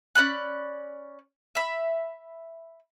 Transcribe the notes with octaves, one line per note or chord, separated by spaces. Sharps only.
C#4 D5 B5 F#6
E5 B5